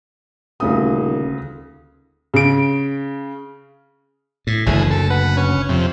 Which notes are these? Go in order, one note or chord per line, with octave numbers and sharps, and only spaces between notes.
D#1 D2 C#3 D#6
C#3 D7
A2
F#1 D2 E3 A3 G#4
A4
B4 F#5
C#4
F2 C3